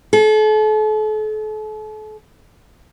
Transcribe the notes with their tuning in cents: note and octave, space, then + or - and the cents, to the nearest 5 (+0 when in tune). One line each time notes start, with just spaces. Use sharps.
A4 -40